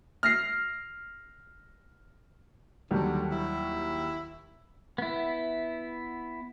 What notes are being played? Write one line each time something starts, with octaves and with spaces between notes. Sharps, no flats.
F6 A#6 C7
D#2 D3 F#3 G3
E4
B3 E4